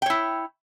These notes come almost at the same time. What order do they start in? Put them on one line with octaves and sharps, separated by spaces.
G5 C#5 E4